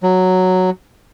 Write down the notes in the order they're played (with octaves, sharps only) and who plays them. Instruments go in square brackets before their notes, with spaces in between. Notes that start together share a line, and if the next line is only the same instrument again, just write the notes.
[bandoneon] F#3